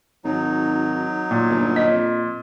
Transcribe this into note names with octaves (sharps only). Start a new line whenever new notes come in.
G#1 F#3 D#4
A#2
G1
D#5
F2